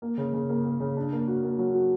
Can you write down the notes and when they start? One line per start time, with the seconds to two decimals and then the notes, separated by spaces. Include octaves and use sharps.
0.02 A#3
0.18 C#3
0.34 C#3
0.49 A#3
0.65 A#3
0.80 C#3
0.97 D4
1.12 A#3
1.27 F#4
1.43 A#3
1.59 F#3
1.74 F#4